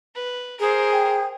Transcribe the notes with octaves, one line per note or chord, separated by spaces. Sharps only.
B4
G#4 A#4 C5
G5